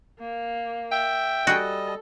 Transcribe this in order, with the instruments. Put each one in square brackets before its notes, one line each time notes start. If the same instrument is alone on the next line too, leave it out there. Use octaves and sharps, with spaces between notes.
[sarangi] A#3
[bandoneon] E5 [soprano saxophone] G5
[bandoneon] G3 D#5 [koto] F#4 G#4 [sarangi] A4